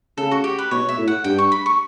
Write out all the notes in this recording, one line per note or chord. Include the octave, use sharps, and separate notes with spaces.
C#3 A4
F#4
G4
B4
B2 C#5
E5
A2
F#5
G2 G5
C#6
B5
C#6